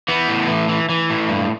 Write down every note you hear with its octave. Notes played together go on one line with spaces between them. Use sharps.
E3 B3
A2
E3
E3
E3
A2
G2